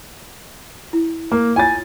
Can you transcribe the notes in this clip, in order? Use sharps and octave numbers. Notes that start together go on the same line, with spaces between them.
E4
A#3
E4 F4 C#5 G#5 A6